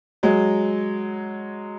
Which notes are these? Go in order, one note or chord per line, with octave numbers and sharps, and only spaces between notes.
F#3 G#3